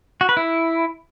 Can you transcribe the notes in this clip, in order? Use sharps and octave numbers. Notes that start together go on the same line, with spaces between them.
F#4
B4
E4